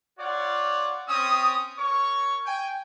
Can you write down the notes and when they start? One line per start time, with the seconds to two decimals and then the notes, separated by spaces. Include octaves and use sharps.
0.18 F4 C#5 D5 F#5
1.07 C4 C#4 D#6
1.76 A#4 C#5 C#6
2.45 G5 G#5